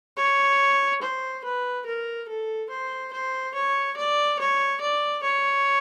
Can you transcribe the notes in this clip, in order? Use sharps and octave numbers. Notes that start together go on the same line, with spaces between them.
C#5
C5
B4
A#4
A4
C5
C5
C#5
D5
C#5
D5
C#5